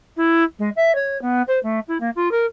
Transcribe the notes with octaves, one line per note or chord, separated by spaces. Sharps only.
E4
G#3
E5
C#5
B3
C5
A3
E4
A#3
F4
A#4